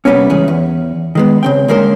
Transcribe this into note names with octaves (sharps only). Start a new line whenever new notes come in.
C3 E3 G3 A#3 B3 C#4
C#2 E3 C#4 G#4
E2
D#3 G#3 B3
C#3 C4 G5
D3 G#3 A#3 C#4 A#4 C5